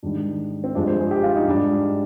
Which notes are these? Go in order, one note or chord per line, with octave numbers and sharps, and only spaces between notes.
G#2 D#3 G3 D4
C4
G2 F3 G#3 D4
C5
G#4
G4
F4
D#4
G#2 G3 D4